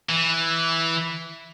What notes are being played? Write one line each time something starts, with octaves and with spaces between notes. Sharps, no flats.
E3